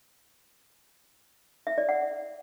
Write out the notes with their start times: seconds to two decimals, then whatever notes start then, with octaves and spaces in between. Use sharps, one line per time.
1.67 E5
1.78 D5
1.89 F#5